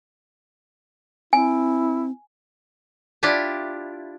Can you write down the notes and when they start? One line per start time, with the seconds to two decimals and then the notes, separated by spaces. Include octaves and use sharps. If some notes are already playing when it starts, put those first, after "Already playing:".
1.33 C4 E4 G#5
3.23 D4 E4 F4 G4